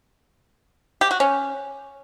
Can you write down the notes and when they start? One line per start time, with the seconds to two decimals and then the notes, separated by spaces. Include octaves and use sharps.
1.01 G4
1.11 F#4
1.20 C#4